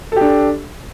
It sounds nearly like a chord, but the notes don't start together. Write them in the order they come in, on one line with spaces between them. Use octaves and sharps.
A4 G4 D4